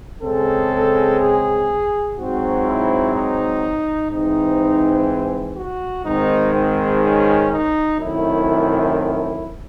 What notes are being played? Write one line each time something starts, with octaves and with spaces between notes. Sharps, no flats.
C#3 G#3 C4 A4
G#4
G#2 F#3 C4 F#4
E4
D#4
G#2 E3 C4 D#4
F#4
G#2 D#3 G#3 C4 D#4
C4
C#4
D#4
F#2 D#3 A3 C4 E4
E4